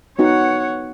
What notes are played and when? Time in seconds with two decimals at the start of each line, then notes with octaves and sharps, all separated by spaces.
0.19 B3 D#4 F#4 C#5 F#5